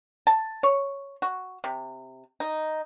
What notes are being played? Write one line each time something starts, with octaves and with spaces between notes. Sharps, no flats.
A5
C#5
F#4
C3
D#4